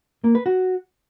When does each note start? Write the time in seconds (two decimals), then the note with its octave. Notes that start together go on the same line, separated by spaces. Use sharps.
0.24 A#3
0.35 B4
0.46 F#4